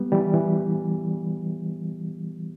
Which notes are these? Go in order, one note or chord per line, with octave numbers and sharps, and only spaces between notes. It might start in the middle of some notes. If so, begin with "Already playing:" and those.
Already playing: G3 B3
E3 G3
E3